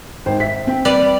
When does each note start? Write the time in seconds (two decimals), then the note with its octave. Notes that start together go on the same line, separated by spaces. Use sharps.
0.26 G#1 C5 G5
0.40 E5 B6
0.67 C4 G5
0.85 G3 B4 D5